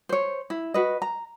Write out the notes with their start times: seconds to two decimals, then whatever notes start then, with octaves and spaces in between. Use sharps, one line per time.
0.09 C5 C#5
0.50 E4
0.74 F#4 B4 D#5
1.02 A#5